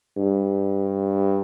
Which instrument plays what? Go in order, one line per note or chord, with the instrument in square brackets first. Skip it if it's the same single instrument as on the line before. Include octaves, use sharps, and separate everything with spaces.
[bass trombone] G2